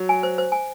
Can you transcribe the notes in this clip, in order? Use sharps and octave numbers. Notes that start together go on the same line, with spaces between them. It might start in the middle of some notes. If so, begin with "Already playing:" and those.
Already playing: F#3
G#5
C5
C5
G#5